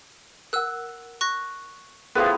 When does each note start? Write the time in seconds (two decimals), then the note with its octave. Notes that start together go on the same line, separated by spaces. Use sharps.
0.53 A#4 F#5 E6 F#6
1.21 C#6 F#6 A#6
2.15 A2 F3 B3 G#4 B4 C5 F5 D#6